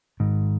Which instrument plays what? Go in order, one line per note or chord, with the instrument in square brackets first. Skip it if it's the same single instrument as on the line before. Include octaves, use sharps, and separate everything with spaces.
[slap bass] G#2 D#3